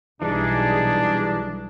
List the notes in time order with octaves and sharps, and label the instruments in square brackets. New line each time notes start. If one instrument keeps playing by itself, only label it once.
[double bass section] B1 [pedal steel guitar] E3 G3 D#4 [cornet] D4 [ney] G#4